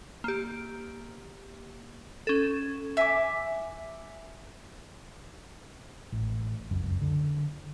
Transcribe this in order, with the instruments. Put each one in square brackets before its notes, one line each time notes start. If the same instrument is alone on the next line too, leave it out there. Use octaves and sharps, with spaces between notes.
[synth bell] A#3 G4
C#4 A4
[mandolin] E5 G#5 D6
[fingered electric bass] A1
F1 C#2 F#2
D3